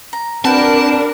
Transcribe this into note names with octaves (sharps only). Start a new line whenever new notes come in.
A#5
C4 D4 F#4 A#4 B4 G5 A5